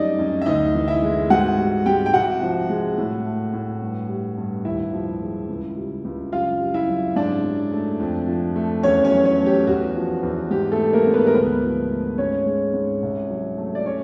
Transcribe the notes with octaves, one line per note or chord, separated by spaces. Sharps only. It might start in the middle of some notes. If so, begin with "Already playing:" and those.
Already playing: F#2 G3 A3 D#4 D5 D#5
F#2
E5
D2 D#4 D#5
E3
E4 E5
G#3
G#2 F#4 F#5
G3
G#2 G4 G5
G5
C2 F#4 F#5
F3
G#3
A2
A3
A2
G2
G3
G2
D#2 E4 E5
F3
G#3
C#2
G3
C#2
F#2 F4 F5
G3
E4 E5
F#2
G#2 D4 D5
F#3
A3
F2
F3
A3
E2 C#4 C#5
C#4 C#5
F#3
C#4 C#5
A3
G4
E2 F#4
F3
E2
G#2 G4
A3 A4
G3
A#3 A#4
G#2
B3 B4
A#4
D2 B3 B4
F3
A3
G#2 C#4 C#5
G#3
G#2
C2
F#3
A3
D5
C#4 C#5